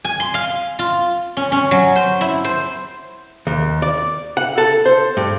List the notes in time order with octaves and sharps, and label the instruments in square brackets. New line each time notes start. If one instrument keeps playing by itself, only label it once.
[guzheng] G#5
C6
F5
F4
C#4
C#4
F#3
C5
E4
C5
[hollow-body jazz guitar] D#2
D5
F#5
A4
C5
G2